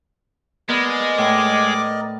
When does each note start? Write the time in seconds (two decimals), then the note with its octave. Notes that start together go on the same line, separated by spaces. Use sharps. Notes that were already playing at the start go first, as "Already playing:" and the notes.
0.69 G#3 B3 A#4 D5 D#5
1.18 A2 D6